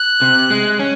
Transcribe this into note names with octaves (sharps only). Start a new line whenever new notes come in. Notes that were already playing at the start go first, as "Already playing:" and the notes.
Already playing: F#6
C3
G#3
C#4